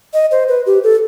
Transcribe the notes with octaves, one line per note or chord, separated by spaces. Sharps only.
D#5
C5
B4
G4
A4